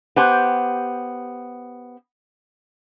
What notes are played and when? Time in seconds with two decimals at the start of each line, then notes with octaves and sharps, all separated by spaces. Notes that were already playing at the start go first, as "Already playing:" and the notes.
0.16 B3 G4 C5 G#5